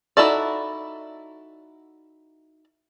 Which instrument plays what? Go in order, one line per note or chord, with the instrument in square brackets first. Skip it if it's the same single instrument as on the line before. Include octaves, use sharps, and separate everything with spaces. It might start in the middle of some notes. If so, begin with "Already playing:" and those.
[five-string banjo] D#4 E4 F#4 A4 D5